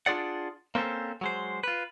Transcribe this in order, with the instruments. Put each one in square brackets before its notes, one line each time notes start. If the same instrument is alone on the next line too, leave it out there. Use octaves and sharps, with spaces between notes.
[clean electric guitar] D4 F4 G#4 D5 F#5
A#3 C4 C#4 A4 C5
F#3 G#3 C5
F4 B4